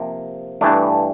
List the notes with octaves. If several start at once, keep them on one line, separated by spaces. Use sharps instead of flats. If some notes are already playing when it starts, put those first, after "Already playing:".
Already playing: C3 F3 A#3
G2 E3 A3 D4